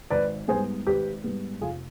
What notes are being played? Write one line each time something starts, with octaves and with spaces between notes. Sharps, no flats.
G#1 B4 D5
G#2 G3 B3 G#4 C5
G#1 G4 B4
G#2 G3 B3
F1 F4 G#4